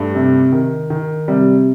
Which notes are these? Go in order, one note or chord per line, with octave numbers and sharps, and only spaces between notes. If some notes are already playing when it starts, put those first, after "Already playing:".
Already playing: G2 A3
C3
D#3
D#3
C3 G3